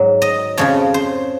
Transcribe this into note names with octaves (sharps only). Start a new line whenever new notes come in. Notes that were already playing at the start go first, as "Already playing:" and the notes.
Already playing: G#2 F#3
D#5
F2 C#3 F3 C#5
C5